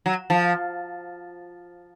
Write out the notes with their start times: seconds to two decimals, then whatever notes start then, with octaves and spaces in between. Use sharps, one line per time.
0.06 F#3
0.30 F3